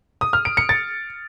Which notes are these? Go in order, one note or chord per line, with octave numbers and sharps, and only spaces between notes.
D#6
F6
D7
C#7
A6